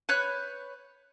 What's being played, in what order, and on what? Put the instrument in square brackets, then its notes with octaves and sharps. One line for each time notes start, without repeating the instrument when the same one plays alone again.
[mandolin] B4 C#5 F#6 G6